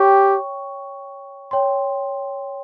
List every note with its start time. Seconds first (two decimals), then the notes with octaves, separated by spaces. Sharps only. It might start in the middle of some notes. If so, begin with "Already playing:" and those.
Already playing: G4 C#5 G5 C#6
1.51 C#5 G5 C6